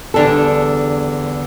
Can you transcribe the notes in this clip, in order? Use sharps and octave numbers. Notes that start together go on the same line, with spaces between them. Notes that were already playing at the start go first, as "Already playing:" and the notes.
E2 D3 G3 D4 A4